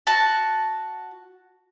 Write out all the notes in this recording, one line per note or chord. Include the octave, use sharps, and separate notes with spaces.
F#4 A5